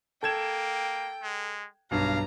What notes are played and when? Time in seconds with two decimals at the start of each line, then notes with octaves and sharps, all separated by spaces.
0.23 A#3 A4 G5 G#6 E7
1.22 G#3
1.91 B1 G2 F5 A#5